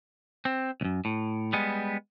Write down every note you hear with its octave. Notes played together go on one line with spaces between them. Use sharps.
C4
C#2 F#2
A2
G3 G#3 B3